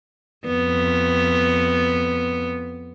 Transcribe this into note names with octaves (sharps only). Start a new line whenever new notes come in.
F2 B3